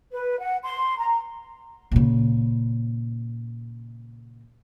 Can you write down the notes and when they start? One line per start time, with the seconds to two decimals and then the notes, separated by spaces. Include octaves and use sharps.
0.12 B4
0.39 F#5
0.63 C6
0.98 A#5
1.91 A#2 C#3